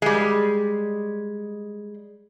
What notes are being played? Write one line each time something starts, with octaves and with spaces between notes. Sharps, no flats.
G3 G#3